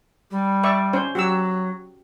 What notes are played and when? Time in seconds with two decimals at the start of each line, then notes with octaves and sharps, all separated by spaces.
0.30 G3
0.64 D5 E5 C#6
0.93 C#4 C5
1.15 F#3 F#4 G4 E6